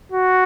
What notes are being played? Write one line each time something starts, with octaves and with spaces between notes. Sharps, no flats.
F#4